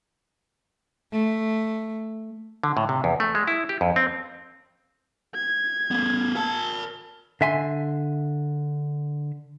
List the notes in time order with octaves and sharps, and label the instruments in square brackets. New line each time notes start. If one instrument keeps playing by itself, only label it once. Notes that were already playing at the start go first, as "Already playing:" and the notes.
[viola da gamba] A3
[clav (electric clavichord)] D3
A2
C3
E2
A3
G#3
E4
G4
F2
C4
[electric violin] G#6
[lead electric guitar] A3 B3
A#4 A5
[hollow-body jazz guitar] D3 E5 G#5 C6